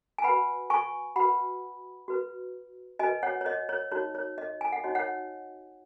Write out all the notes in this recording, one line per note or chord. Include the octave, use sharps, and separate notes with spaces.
G#5
F#4 B4 F#5 B5
G#5 C#6
F#4 B4 F#5 B5
F#4 B4
F#4 B4 D#5 G#5
C#5 F#5
C#5
D#5
C#5
D#4 F#4 C#5
C#5
D#5
G#5
F#5
D#4 F#4 C#5 D#5
C#5 F#5